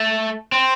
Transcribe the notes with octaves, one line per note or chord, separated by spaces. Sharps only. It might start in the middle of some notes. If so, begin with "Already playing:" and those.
Already playing: A3
C4